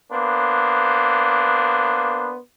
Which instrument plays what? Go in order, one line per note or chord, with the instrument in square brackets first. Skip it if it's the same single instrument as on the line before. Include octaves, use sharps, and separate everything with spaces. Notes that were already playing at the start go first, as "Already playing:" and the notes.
[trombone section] A#3 B3 D4 C5